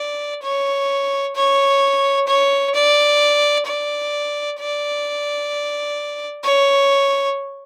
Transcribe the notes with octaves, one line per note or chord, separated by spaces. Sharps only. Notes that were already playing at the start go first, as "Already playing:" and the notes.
Already playing: D5
C#5
C#5
C#5
D5
D5
D5
C#5